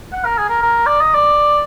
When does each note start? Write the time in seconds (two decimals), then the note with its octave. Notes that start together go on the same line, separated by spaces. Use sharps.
0.12 F#5
0.25 A#4
0.38 G#4
0.49 A#4
0.62 A#4
0.86 D5
1.01 D#5
1.14 D5